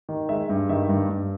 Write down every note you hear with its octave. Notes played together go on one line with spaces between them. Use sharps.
D#3
G#3 E5
G2
D#3 E5
G2
G2